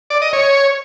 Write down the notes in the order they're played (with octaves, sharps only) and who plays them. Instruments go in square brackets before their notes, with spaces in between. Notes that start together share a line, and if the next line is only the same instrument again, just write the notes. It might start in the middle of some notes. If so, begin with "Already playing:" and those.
[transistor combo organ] D5
D#5
C#5